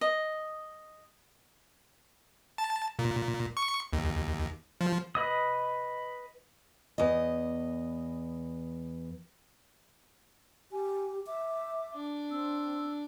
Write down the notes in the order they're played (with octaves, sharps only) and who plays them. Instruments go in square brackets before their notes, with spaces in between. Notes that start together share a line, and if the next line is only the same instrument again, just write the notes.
[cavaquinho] D#5
[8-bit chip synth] A5
A#2
C#6
D#2
F3
[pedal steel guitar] B4 D#5 D#6
[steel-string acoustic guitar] E2 D#5
[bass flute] G4 [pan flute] G#5
[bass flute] E5 [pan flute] D6
[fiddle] D4
[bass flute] C4 [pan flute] E6